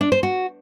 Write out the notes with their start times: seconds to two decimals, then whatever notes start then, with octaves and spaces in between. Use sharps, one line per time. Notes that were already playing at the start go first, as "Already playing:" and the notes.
0.01 D4
0.12 C5
0.23 F#4